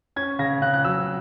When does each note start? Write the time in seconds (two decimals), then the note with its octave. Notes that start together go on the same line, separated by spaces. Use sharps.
0.16 C#4 G#6
0.39 C#3 A#6
0.62 C#3 F#6
0.74 F#6
0.84 F#3 E6